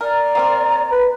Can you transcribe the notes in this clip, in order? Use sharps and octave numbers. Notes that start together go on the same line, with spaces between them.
A#4 D5 A#5
A#3 C4 A#4
B4